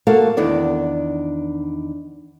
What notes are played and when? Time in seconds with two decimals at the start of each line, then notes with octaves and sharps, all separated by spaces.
0.07 A3 A#3 F#4 A4 F5
0.37 E2 D#3 D4 D5